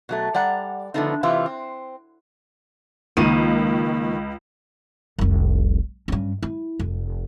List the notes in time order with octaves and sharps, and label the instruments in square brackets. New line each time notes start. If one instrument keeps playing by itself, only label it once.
[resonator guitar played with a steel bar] B2 F#3 A3
G3 D5 F#5 A#5
D3 F3 A3 B3 C4 D#4
C3 E3 E4 F4
C4
[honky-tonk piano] C#2 D#7 [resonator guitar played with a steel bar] D#3 [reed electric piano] A#3
[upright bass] F1 C2
G2 C#4
E4
F1